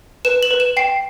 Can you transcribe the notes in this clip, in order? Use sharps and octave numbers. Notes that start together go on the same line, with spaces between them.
B4 E7
F#7
B4
E7
G5 C7